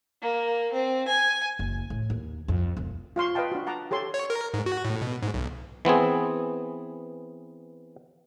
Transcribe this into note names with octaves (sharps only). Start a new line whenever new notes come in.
A#3
C4
G#5
F#1
A2
D#2
F2
E1
F4 F5 C6 C#6
B4 D#5 F5 G5 A5
D4 F#4
F#5 A5 A#5 D6
G4 A4 C#5 C6
C#5
A#4
G#2
F#4
A2
B2
G#2
B1
E3 B3 C4 G#4